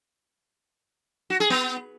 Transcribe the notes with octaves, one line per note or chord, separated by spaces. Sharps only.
F#4
G#4
B3